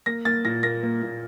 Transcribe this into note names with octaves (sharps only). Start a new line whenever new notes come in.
A#3 A#6
A#3 A6
A#2 A#6
A#3 A#6
A#3
A#2